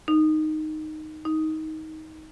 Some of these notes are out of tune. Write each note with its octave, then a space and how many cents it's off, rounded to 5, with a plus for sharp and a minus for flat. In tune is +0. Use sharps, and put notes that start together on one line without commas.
D#4 -5
D#4 +15